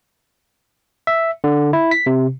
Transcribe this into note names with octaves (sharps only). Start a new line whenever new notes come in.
E5
D3
E4
B6
C3